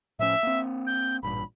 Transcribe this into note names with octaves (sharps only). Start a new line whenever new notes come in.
A2 F3 C#4 E5
A#3 C4
G6
A1 G2 A#2 B5